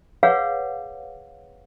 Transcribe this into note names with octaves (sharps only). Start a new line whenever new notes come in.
G#4 B4 C#5 F5 F#5